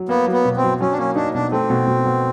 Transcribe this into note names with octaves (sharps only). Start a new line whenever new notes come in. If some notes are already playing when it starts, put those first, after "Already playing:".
Already playing: F#3
A#3 B3
F#3
B3
B2
C4
F#3
F#3 C#4
D4
A#3 C#4
D4 D#4
B2 D4
A3 C4
B2
B2
B2